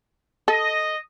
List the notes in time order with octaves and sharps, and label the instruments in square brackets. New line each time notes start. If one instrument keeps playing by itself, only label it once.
[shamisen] A4 [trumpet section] D#5